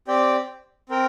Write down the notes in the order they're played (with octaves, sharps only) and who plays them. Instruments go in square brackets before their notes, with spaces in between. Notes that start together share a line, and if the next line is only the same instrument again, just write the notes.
[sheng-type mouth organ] C4 G4 D5 G5
C4 A#4 G5